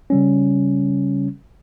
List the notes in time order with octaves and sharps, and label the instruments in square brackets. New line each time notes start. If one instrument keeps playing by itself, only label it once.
[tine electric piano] C#3 G3 C#4